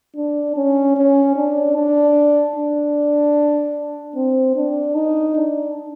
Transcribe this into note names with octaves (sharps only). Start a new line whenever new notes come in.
D4
C#4
C#4
D4
D4
D4
C4
D4
D#4
D4